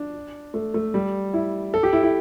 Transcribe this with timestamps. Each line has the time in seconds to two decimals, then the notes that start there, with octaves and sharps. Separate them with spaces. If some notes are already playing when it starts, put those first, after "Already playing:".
Already playing: D4
0.54 A3
0.74 A3
0.94 G3
1.33 E4
1.74 A4
1.83 G4
1.93 E4
2.03 E4